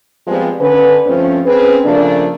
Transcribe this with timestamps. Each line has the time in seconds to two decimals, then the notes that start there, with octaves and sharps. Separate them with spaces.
0.27 F3 G3 G#3 B3 C4 F4
0.60 D3 C#4 B4
1.06 G2 F3 A3 C4 C#4
1.46 C4 C#4 G#4 B4
1.84 C#3 F3 A3 A#3 D4